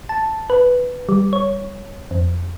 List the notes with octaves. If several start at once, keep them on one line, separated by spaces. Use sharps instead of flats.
A5
B4
G3
C#5
F2